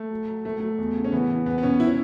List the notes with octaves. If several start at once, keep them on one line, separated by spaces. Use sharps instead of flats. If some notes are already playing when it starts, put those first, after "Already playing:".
Already playing: A3
F#3
F#3
F#3 A3
F#3 A3
E2
C#3
C#4
E3 B3
E3
E2 B3
B3
B2 C#4
E4
C#4